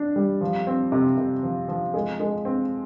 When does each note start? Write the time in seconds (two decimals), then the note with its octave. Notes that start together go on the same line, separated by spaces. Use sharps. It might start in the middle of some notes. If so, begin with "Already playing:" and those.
Already playing: D4
0.16 G3
0.41 F3
0.67 C4
0.92 C3
1.18 C3
1.43 F3
1.68 F3
1.94 G#3
2.20 G#3
2.45 C4